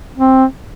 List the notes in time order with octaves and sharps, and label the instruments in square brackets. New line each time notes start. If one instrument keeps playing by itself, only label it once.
[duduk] C4